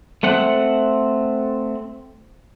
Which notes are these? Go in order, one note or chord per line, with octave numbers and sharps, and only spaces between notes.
A3 C4 F#5